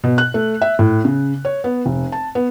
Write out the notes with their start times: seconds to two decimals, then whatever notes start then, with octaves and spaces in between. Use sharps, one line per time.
0.04 B2
0.18 F#6
0.34 A3
0.62 E5
0.79 A2
1.05 C#3
1.45 C#5
1.64 B3
1.86 F1
2.12 A5
2.35 B3